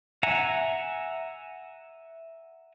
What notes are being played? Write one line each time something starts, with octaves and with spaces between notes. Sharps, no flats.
E5 F#5 G#5 A#5